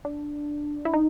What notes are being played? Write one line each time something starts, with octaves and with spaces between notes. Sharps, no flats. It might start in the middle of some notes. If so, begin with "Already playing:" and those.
D4
E4
D#4